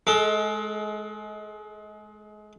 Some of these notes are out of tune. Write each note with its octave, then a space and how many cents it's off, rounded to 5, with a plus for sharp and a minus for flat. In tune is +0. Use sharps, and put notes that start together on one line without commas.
G#3 +30 A4 +0